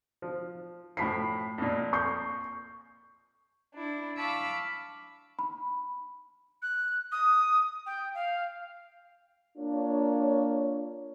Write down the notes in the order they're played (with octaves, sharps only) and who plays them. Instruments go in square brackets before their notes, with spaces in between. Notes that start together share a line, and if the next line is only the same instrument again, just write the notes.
[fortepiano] F3
[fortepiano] A2 F3 [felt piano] B5 B6 C7
[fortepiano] F2 A#2
[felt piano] C#6 G6 C7
[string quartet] D4 E4
F5 A5 B5 C#6 D6 E6
[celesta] B5
[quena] F#6
D#6
G5
F5
[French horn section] A#3 D4 F4 C#5